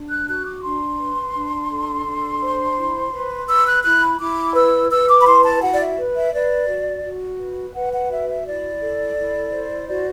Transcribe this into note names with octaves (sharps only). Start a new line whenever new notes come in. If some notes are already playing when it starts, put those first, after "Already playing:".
Already playing: D4
F#6
F#4 F#6
D6
D4 C6
B4
D4
A4
D4
C5
E4
B4
B4 E6
F#6
E4 F#6
B5
E4 D6
B4 E6
B4 E6
D6
B5
E4 C6
A5
F#4 F#5
D5
E5
B4
E5
B4 D5
F#4
F#4
B4
B4 F#5
F#5
F#4 E5
E5
E4 D5
A4
E4
C5
F#4 D5